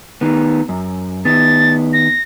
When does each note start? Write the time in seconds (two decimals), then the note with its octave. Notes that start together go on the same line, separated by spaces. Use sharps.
0.21 D#3 B3
0.69 F#2
1.25 D#3 B3 A6
1.93 A#6